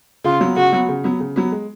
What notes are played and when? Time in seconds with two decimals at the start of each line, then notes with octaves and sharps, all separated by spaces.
0.24 C#3 F4
0.41 F#3 B3
0.56 C#3 F#4
0.73 F#3 B3
0.89 C#3
1.04 F#3 B3
1.20 C#3
1.36 F#3 B3
1.52 G#3